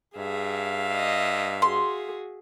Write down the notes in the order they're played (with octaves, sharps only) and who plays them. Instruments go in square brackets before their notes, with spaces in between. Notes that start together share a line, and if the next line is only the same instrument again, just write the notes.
[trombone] G2 [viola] G#4 [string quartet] E5 F5
[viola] D#5
[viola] F#4 G#4 [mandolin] C6